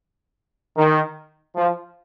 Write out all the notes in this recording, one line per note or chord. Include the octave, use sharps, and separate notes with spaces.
D#3
F3